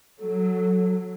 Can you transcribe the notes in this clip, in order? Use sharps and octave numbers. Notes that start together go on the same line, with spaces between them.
F#3 A4